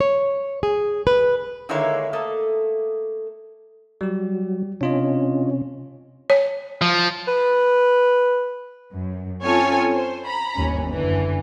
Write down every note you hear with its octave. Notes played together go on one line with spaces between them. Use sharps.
C#5
G#4
B4
D3 D#3 G#3 A#3 E4 C#5
A3 A#3 A4 D#5
F#3 G3 G4
C3 C#4 D4 F4 D#5
C#5
F3
B4
F#2
C4 C#4 F4 A4 C#5 G#5
C5
A#5 B5
G1 D#2 C#4
F#2 D3 E3